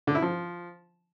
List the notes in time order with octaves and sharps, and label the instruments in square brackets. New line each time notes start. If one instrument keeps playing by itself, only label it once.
[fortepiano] D3
E4
F3